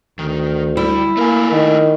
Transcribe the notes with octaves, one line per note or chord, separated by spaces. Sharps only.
D2 D#3
G3 E4
A3 A#3 A#4 G#5
D#3